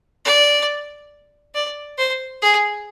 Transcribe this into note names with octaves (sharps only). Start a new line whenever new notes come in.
D5
D5
C5
G#4